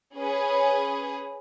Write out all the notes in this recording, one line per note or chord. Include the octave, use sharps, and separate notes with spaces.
C#4 G#4 B4